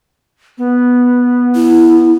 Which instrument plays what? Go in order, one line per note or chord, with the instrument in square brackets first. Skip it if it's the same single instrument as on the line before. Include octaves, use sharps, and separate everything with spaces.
[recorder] B3
[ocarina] E4